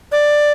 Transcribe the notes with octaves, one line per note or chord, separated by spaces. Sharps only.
D5